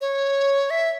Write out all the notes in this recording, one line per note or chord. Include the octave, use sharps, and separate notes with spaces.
C#5
E5